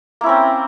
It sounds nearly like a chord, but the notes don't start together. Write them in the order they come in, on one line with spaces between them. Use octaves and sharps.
A#3 E4 C#4 C4